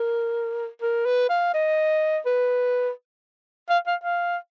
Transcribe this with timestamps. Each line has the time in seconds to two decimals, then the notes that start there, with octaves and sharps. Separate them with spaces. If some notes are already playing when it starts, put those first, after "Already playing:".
Already playing: A#4
0.82 A#4
1.06 B4
1.30 F5
1.54 D#5
2.26 B4
3.70 F5
3.87 F5
4.04 F5